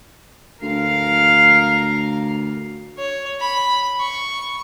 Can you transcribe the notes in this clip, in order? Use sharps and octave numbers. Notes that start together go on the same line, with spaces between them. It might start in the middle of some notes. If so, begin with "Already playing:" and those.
D2 A#4 F5
C#5
B5
C#6